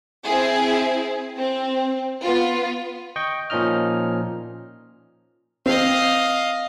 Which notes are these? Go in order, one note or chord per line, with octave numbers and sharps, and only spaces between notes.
C4 E4 G#4
C4
B3 F4
D#5 G5 C#6
A#2 F3 C#4 D#4 D#5 F6
C4 D#5 F5